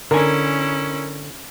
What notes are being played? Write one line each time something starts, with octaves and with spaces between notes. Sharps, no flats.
D3 C#4 E4 A#4 G#5